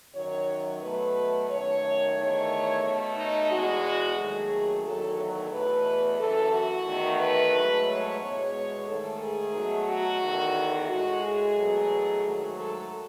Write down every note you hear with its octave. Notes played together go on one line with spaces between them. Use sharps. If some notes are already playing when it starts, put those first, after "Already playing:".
F#2 D#3 F#3 C#5
B2 F#3 A3 B4
F#2 D#3 A3 C#5
E2 D#3 A3 C#5
B2 A3
D#4
E2 B2 G#3 F#4
D#2 D#3 F#3 A3 G#4
E2 D#3 F#3 A3 A4
C#5
E2 B2 A3 B4
F#2 E3 A3 A4
F#4
E2 D#3 A3
B4
G#2 F#3 A3
C#5
E2 B2 G#3 C#5
G#2 D#3 A3 A4
G#4
B2 F#3 A3
F#4
E2 D#3 A3
A2 G#3 F#4
G#4
E2 B2 F#3 A3
G#2 D#3 F#3 A3
A4